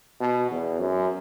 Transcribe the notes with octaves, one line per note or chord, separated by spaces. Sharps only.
B2
E2
F#2